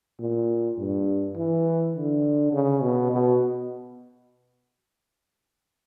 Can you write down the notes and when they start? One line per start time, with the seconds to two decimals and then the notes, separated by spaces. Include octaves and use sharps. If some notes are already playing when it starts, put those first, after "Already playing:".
0.20 A#2
0.77 G2
1.36 E3
1.95 D3
2.53 C#3
2.82 B2
3.11 B2